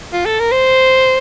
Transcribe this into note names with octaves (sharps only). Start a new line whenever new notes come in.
F4
A4
A#4
C5